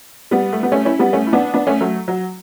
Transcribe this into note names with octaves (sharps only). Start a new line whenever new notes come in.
G3 B3
A3
B3
A3 C#4
C#4 E4
G3 B3
A3 C#4
E4
B3 D4
B3 D4
A3 C#4
F#3 A3
F#3